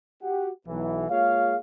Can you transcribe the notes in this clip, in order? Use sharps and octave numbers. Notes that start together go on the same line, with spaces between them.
F#4 G4 F#5
B1 E3
G#3 A#3 F4 G#4 C#5 F5